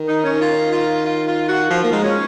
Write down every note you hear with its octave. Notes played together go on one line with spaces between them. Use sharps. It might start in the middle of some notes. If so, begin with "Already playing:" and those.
Already playing: D#3
D#4
C#4
F4
F4
F4
F4
F#4
F3 F4
A#3
G#3 D#4
C#4